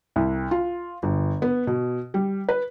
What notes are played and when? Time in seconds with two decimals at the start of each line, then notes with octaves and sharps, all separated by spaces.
0.16 C2
0.51 F4
1.03 G1
1.42 B3
1.67 B2
2.14 G3
2.49 B4